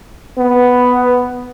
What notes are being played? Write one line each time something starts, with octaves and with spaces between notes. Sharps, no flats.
B3